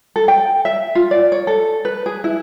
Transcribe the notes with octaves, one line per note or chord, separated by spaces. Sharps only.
A4
G5
E5
F4
D5
C#5
A4
B4
G#4
E4